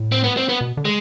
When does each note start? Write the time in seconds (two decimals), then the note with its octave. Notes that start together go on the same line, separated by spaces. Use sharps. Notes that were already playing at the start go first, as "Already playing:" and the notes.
Already playing: A2
0.12 C4
0.24 B3
0.37 C4
0.49 B3
0.61 B2
0.77 D3
0.85 G#3